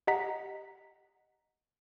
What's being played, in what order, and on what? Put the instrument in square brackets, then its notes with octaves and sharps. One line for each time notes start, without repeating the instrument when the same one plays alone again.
[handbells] G4 D#5 F#5 A#5 B6